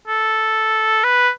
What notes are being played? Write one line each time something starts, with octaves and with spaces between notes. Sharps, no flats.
A4
B4